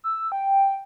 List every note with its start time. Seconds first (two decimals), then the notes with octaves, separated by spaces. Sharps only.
0.04 E6
0.32 G5